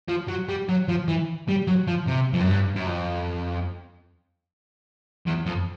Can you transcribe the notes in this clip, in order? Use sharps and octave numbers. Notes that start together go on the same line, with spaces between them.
F3
F#3
G3
F#3
F3
E3
G3
F#3
F3
C3
F2
F#2
G2
F#2
F2
E2
F2